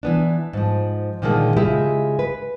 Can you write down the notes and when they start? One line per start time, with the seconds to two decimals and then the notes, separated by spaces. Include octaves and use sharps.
0.03 E3 B3 D4
0.53 G#2 F3
1.22 A#2 D3 D#3 F3 G#3 A#3
1.57 C#3 G#3 E4 F4 G4
2.19 B4